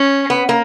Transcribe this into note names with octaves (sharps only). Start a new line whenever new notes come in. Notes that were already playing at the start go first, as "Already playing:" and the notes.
Already playing: C#4
B3
A#3